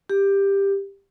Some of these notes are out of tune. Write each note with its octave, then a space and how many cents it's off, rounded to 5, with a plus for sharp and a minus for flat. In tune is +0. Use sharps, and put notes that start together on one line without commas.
G4 +10